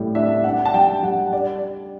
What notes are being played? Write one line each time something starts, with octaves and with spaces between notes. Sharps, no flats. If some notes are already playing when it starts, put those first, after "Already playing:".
Already playing: A2 G3
D4 E5
D4 F#5
A5
G3 G5
G3 F#5
D4 D5